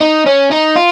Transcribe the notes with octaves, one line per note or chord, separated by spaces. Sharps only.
D#4
C#4
D#4
F4